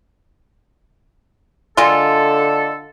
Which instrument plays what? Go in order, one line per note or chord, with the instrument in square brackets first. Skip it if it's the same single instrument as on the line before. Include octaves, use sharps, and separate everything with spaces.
[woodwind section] D3 A4 [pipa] G#3 A#3 F4